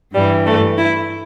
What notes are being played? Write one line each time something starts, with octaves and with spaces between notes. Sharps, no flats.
G2 E3 G3
A3
E4